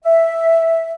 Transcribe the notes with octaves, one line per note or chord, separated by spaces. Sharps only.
E5